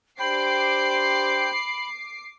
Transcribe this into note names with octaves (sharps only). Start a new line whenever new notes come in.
D4 G4 C5 G5 B5 D6 C7